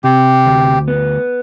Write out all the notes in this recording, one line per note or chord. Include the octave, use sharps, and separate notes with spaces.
C3 G4
D2
B3